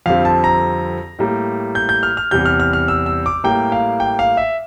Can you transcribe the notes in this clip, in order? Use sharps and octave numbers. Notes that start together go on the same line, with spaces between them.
F2 D3 G3 C4 F5
A5
A#5
A2 G3 A#3
G6
G6
F6
F6
E2 C3 G3 G6
F6
F6
F6
E6
E6
D6
A2 G3 A#3 G5
F5
G5
F5
E5